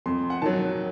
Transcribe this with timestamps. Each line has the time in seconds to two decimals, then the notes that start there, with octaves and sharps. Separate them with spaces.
0.06 F2 C6
0.30 F#5
0.42 D#3 F#3 A5